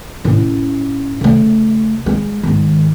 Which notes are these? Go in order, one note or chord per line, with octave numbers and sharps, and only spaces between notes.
A2 C#4
C#3 A3
G#3
G#2 D#3